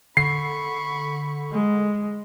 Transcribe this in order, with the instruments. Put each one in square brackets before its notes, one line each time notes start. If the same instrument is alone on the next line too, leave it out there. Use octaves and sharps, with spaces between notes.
[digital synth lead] D3 [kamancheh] B5 C#6 [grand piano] C7
[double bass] G#3